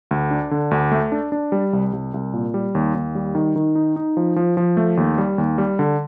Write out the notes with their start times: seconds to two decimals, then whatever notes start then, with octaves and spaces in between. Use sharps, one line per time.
0.11 D2
0.31 D4
0.51 D3
0.71 D2
0.92 A3
1.12 D4
1.32 D4
1.52 G3
1.73 C2
1.93 C2
2.14 C2
2.33 A#2
2.54 G3
2.75 D#2
2.95 D#2
3.15 G3
3.35 D#3
3.56 D#3
3.75 D#4
3.96 D#4
4.17 F3
4.36 F3
4.57 F3
4.77 A3
4.97 D#2
5.18 G3
5.38 D#2
5.58 G3
5.79 D3